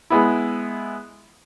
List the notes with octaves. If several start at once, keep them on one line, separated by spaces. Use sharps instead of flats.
G#3 B3 E4